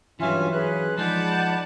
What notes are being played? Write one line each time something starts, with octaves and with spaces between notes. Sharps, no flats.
G2 E3 F#3 C#4 F4 E5 G#5
C#4 G#4 B4 F#6
F3 G#3 D#4 D5 F#5 A5 B5 G6